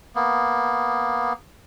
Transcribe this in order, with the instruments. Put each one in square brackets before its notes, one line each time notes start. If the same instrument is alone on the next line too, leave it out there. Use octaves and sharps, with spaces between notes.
[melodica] A#3 B3